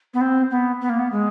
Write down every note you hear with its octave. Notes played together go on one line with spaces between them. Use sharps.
B3
C4
B3
B3
A#3
B3
G#3